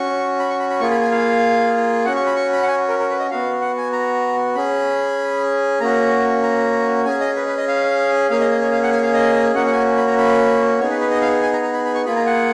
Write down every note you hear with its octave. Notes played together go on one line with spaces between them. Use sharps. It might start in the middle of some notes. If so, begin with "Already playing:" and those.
Already playing: C#4 F#4 C#6
B5
C#6
B5
B5
A#3 F4 G#4 C#6
B5
G#5
F5
C#4 F#4 F#5
C#6
B5
C#6
B5
F#5
G#5
A#4
A#4
B4
D#5
B3 F#4 F5
F#5
G#5
A#5
C#4 G#4 B5
A#3 C#4 F#4 A#5
A#5
C#4 G#4 G#5
D#5
B4
B4
D#5
F5
A#3 C#4 G#4 F5
D#5
D#5
C#5
F5
F#5
G#5
F5
D#5
A#3 C#4 F#4 F#5
F#5
G#5
B5
A#5
B5
B3 D#4 G#4 C#5
B4
B4
D#5
F5
G#5
A#5
A#5
B5
B5
C#6
A#3 F4 G#4 B5
A#5
F#5